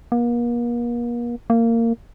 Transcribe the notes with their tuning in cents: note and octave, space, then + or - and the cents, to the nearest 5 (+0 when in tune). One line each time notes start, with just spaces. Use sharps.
A#3 +40
A#3 -20